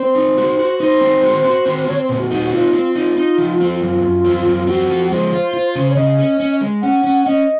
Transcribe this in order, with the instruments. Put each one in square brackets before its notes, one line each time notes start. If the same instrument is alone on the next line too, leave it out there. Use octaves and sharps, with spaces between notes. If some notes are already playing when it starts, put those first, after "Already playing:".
Already playing: [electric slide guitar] C4 [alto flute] C5
[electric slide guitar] D#4
F#4
F#4
[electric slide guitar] D#4 [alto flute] C5
[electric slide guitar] C4
F#4
F#4
C4
[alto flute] C5
[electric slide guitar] C4 [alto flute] C#5
[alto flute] C5
[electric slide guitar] A#2 [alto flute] C5
[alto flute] F#4
[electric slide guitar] D#4 [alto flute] F#4
[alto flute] F#4
[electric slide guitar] C4 [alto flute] F4
[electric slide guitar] C4
[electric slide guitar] D#4 [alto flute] F4
[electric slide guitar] D#4
F3
C4
[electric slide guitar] F#2 [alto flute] F4
[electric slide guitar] F#2
C4
F#2
[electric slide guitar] C4 [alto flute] F#4
[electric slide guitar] F3
[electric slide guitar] G#3 [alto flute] C5
[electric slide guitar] F4
F4
C#3
[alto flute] C#5
[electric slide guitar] C#3 [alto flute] D#5
[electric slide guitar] C#4
C#4
G#3
[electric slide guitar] C#4 [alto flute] F#5
[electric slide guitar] C#4
[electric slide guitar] C#4 [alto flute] D#5